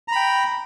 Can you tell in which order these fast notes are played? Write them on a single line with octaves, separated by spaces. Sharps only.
A#5 B5 G5